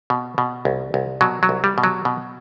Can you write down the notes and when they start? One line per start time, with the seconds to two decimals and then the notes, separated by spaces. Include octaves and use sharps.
0.10 B2
0.38 B2
0.65 C2
0.94 C2
1.21 B2 F#3
1.43 F#3
1.49 C2
1.64 G3
1.78 B2
1.84 F#3
2.05 B2